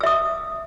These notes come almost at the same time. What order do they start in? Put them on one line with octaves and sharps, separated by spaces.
E6 E5 D#6